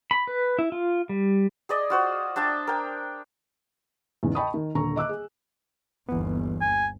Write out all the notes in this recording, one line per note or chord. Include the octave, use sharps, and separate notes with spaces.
B5
B4
E4
F4
G3
G#4 D5 D#5
F4 F#4 C5
D4 E5 G5 A5
A#4 G5
E2 G#2 C#3
D#5 G5 A5 B5 C#6 D#6
D#3
D#1 D3 A#5 C#6
D#5 D6 E6 F#6
G#4
G1 D#2 E3 B3
G#5